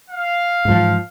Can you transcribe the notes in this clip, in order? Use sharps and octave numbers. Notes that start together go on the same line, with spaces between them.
F5
G#2 E3 F3